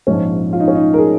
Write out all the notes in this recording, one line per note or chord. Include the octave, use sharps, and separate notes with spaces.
A#1 G#2 F3 C#4
F4
D#4
C#4
D#4
A#4
G#4